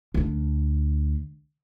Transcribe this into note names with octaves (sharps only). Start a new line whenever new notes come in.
D2 D4